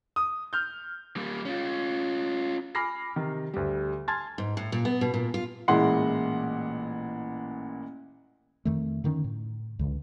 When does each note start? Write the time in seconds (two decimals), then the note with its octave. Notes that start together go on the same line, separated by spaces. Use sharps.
0.16 D#6
0.53 F6 G6
1.17 G3 A#3
1.45 C#4 F4
2.75 G#5 B5 D6 F6 A#6 C7
3.16 C3 D#3
3.54 D2 G3
4.08 G#5 A5 C6 F6 G#6 A6
4.38 G#2
4.57 A2
4.72 A#2
4.85 B3
5.01 B2
5.14 A#2
5.34 F4
5.68 A1 A#2 G#3 E4 F#5 C6
8.65 F2 D#3 A3
9.04 D3 D#3 A#3 C#4
9.24 A2
9.79 C#2 D3